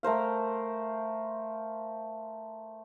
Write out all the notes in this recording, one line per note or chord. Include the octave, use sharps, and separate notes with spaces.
A3 A#4 C5 F5